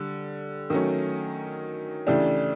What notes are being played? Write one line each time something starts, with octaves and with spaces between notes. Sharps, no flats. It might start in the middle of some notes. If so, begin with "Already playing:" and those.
Already playing: D3 G3
D#3 F#3 A3 C#4
C#3 E3 A3 D4 G4